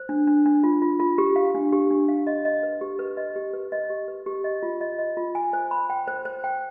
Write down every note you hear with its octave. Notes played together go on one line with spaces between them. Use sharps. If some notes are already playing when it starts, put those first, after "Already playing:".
Already playing: C5
D4
D4
D4
F4
F4
F4
G4
F5
D4
G4
D4
F5
D#5
D#5
B4
G4
B4
D#5
G4
B4
D#5
G4
B4
G4
D#5
F4
D#5
D#5
F4
G#5
C5
B5
G5
C5
C5
G5